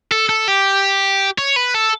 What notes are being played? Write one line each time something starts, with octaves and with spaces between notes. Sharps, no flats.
A4
A4
G4
C#5
B4
A4